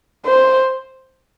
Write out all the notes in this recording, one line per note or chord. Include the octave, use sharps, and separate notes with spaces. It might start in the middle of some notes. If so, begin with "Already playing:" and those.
C5